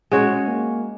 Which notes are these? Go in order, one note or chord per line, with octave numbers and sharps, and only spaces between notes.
G#3 C#4 F#4 C#5
A#3